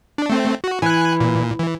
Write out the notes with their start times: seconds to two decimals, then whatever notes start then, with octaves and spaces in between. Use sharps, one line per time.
0.18 D4
0.30 A3 C4
0.64 F#4
0.82 E3 G#5 F#6
1.20 A#2
1.59 E3